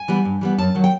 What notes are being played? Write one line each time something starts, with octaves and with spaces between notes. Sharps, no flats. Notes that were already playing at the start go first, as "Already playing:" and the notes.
Already playing: G#5
E3 G3 B3
G2
E3 G3 B3
F#2 A5
D#3 F#3
G5